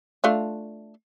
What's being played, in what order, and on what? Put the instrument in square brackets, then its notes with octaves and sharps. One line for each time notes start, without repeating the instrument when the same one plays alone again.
[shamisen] A3 D4 F4